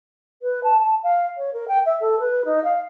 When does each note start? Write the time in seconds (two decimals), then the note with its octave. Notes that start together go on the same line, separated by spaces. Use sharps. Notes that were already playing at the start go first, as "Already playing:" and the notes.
0.42 B4
0.63 A5
0.80 A5
1.03 F5
1.37 C#5
1.53 A#4
1.68 G5
1.85 E5
2.00 A4
2.19 B4
2.45 D#4
2.64 F5